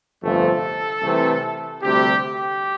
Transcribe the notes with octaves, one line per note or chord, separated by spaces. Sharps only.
G1 F2 C3 F3 A3 A4
C2 C3 E3 A3
D2 C3 G3 G4
G4